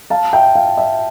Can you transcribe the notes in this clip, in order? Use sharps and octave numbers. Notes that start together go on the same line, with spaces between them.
F5 A5
E5 G5
F5
E5